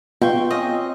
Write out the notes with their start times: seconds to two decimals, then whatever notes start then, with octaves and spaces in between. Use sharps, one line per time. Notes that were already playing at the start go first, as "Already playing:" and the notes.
0.22 B2 F4 F5 G5 C6 C#6
0.50 C4 C#4 D#5